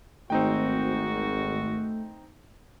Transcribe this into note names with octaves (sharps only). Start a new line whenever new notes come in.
G#1 A3 C4 D#4 F#4 G5